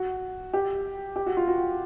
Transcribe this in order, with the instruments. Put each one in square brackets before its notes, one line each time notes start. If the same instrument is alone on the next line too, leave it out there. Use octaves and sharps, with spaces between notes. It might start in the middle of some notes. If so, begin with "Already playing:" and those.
Already playing: [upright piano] F#4
G4
G4
F#4
F4
F#4